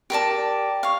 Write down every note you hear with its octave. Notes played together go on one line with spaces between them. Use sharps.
G4 A#4 D5 A5
C#5 F5